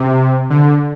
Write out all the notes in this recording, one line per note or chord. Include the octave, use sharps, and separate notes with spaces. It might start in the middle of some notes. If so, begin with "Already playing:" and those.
Already playing: C3
D3